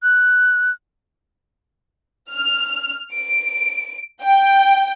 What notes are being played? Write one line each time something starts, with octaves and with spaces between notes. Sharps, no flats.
F#6
F6
D7
G5